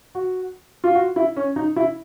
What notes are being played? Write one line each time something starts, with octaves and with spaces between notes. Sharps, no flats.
F#4
F4
F#4
E4
C#4
D#4
E4